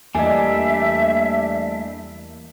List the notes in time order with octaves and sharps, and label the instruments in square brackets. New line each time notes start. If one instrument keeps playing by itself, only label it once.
[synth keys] E2 A#3 [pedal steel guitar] G3 A3 D4 [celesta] D#5 G#5 [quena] E5